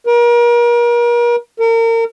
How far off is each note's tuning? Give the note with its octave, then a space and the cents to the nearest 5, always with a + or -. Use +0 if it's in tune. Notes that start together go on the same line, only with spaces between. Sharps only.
A#4 +35
A#4 -35